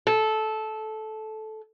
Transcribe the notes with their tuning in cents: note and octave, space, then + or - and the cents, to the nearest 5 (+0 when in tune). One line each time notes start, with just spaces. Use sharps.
A4 -15